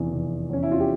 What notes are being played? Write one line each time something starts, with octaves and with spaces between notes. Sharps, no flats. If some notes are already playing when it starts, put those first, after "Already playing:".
Already playing: F1 E2 E3
F1
E2 E3 C#4
E4
F4
G4